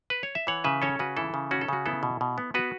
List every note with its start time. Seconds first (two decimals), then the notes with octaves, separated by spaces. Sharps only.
0.10 B4
0.23 C#5
0.35 E5
0.47 E3 C#5 F#5
0.64 C#3 B4 E5
0.82 C#4 A4 C#5
0.99 C#3 F#4 B4
1.17 E3 E4 A4
1.34 C#3
1.51 C#4 F#4
1.61 A4
1.68 C#3 F#4
1.86 B3 E4 A4
2.03 B2
2.21 B2
2.38 B3
2.54 B3 F#4 B4